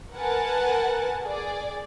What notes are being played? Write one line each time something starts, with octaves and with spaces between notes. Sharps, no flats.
A#4 B4 F#5 G#5 A5
G#4 D5